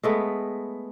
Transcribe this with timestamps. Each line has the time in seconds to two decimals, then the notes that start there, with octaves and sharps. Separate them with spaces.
0.03 G#3 A3 B3